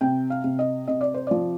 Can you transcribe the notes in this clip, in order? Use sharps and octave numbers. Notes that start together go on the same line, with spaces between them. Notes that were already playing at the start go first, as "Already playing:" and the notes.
C3 G5
F5
C3
D#5
C3 D#5
D5
C5
F3 D5